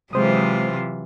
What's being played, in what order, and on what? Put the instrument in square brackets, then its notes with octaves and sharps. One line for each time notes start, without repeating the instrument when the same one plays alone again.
[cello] C3 F4 [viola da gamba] E3 F#3 [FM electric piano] G#3 C5 D#6